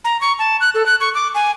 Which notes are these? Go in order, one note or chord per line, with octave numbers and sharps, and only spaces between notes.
A#5
C#6
A5
F#6
A4
F#6
C#6
D6
G#5